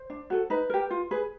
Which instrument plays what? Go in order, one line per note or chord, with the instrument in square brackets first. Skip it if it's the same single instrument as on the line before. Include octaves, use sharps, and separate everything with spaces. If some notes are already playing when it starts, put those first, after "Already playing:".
Already playing: [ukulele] C5
D4
F#4 A4
D#4 B4
G4 A#4
F4
G#4 B4